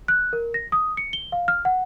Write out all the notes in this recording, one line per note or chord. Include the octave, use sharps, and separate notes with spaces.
F#6
A#4
A#6
D#6
C#7
G7
F5
F6
F#5